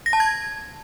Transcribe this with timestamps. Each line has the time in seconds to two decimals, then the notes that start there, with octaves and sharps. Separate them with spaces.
0.06 A#6
0.13 A5
0.20 G#6